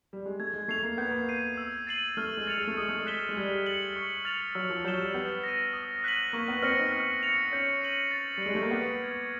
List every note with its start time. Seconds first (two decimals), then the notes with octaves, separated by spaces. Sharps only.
0.13 G3
0.26 G#3
0.39 A3 G#6
0.53 G#3
0.68 A3 C7 F7
0.83 A#3
0.98 B3 G6
1.11 A#3
1.29 C7 D#7
1.57 E6
1.87 A6 C7 D#7 F#7
2.17 A3 F6
2.37 G#3
2.47 A6 C#7 F7
2.57 G#3
2.67 A3
2.77 G#3 D#6
2.89 A3
2.99 G#3
3.06 F#6 B6 E7 G7
3.29 G#3
3.36 G3 E6
3.66 A6 C#7 F#7
3.96 C#6
4.25 F6 A6 C#7 F7
4.55 F#3 E6
4.70 F3
4.84 F#3 G6 C7 E7 G7
4.99 G3
5.14 B3 G6
5.44 A#6 D#7
5.73 D#6
6.04 F#6 B6 D#7 F#7
6.33 A#3 C#6
6.48 B3
6.62 C4 F6 A#6 C#7
6.78 D#4
6.92 F6
7.23 A6 C#7 F7
7.52 C#4 G6
7.81 C7 D#7 F#7
8.11 A6
8.37 G3
8.42 G#3 D7 F#7
8.55 A3
8.62 A#3
8.71 B3 D6
9.01 F6 G#6